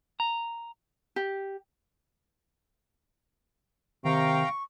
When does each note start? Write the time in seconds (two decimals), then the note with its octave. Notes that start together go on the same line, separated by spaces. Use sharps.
0.20 A#5
1.16 G4
4.05 C3 D#3 F5 G5 A#5 C#6